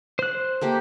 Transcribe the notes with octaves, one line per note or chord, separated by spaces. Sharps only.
C5 F#6
A3 A#3 G4